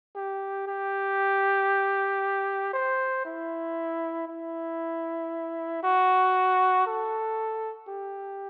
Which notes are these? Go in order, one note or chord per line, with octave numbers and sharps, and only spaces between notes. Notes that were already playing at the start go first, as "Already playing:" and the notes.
G4
G4
C5
E4
E4
F#4
A4
G4